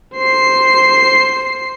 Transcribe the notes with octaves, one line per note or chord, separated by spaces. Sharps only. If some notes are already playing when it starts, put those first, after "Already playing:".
C5 C7